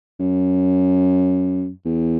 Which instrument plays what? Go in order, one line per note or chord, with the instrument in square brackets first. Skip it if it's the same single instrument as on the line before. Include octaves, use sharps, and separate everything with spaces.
[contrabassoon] F#2
E2